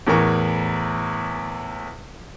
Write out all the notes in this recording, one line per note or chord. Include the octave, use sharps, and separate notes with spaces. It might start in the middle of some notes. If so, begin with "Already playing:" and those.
E2 A2 E3 A#4 C#6